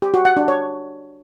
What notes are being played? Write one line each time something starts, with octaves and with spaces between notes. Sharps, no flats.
G4
F#4
F#5
D4
C#5